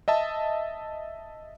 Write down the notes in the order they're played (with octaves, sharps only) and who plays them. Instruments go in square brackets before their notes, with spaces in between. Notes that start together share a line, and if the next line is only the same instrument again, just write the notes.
[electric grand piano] D#5 E5 A5